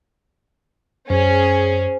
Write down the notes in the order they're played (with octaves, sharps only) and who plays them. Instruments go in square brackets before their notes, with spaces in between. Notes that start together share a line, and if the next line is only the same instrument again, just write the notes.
[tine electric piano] F#2 [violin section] C#4 G#4 [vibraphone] C5